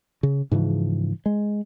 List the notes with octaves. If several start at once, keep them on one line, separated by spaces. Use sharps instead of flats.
C#3
G#2 C#3 E3 F3
G#3